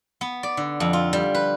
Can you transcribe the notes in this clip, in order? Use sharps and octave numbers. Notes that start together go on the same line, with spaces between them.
B3
D5
D3
F2
F4
G3
B4